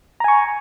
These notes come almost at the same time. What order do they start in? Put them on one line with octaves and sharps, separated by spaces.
A#5 G#5 C#6